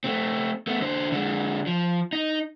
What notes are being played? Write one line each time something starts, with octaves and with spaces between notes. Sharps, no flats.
A3 C4
A3 B3
D3 C5
D3 G#3
F3
D#4